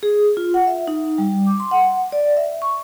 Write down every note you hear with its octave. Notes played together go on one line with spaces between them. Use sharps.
G#4
F4
F#5
E5
D#4
G3
D6
C6
F#5
D5
E5
C#6